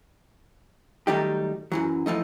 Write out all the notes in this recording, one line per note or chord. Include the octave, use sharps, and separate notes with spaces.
D#3 F#3 G3 A3 D#4 G4
F#2 E3 F#3
E3 F3 A3 D#4